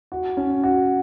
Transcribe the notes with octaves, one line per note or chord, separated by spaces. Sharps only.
F#4
C#4
F#4